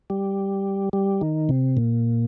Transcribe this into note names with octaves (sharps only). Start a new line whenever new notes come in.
G3
G3
D#3
C3
A#2